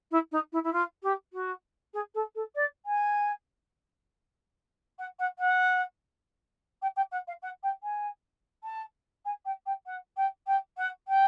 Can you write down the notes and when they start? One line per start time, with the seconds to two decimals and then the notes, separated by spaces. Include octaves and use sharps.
0.11 E4
0.32 D#4
0.52 E4
0.64 E4
0.73 F4
1.03 G4
1.33 F#4
1.94 G#4
2.14 A4
2.35 A4
2.55 D5
2.86 G#5
4.99 F#5
5.19 F#5
5.39 F#5
6.82 G5
6.96 G5
7.11 F#5
7.27 F5
7.42 F#5
7.63 G5
7.83 G#5
8.64 A5
9.25 G#5
9.45 G5
9.66 G5
9.86 F#5
10.17 G5
10.47 G5
10.77 F#5
11.08 G5